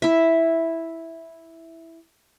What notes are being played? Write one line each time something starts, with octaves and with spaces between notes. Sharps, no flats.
E4 E5